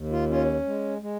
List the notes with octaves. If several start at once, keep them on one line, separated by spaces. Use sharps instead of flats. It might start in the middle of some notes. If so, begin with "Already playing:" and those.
Already playing: D#2
F4
C#4 F4
G#3
G#3